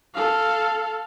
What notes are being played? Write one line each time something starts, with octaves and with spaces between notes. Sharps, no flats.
A4 F5